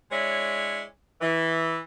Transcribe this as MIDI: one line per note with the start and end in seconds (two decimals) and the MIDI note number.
0.11 0.81 56
0.11 0.81 62
0.11 0.81 64
0.11 0.81 73
1.21 1.78 52